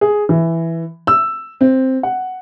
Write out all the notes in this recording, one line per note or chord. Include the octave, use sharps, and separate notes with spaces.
G#4
E3
E6
C4
F#5